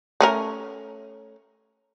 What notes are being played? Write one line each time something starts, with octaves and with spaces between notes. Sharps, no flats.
A3 C#4 A#4